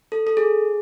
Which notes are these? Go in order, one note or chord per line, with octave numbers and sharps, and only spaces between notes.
A4
A4
G#4